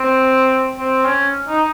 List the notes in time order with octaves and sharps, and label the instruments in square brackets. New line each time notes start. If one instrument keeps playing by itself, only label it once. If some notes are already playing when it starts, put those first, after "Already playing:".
Already playing: [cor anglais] C4
C4
C#4
D#4